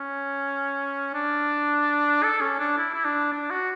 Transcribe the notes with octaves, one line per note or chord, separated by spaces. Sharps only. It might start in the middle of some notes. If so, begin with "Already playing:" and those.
Already playing: C#4
D4
A4
C#4
D4
E4
E4
D4
D4
F#4